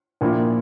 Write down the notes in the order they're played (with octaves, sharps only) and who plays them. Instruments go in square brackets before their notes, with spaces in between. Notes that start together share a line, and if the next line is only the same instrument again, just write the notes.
[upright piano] A#1 A#2 F3 A#3 E4